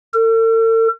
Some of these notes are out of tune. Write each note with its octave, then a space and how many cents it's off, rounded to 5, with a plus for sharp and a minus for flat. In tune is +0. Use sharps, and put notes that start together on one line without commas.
A4 +45